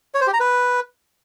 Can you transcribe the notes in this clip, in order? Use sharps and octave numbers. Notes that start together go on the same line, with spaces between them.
C#5
C5
G4
A#5
B4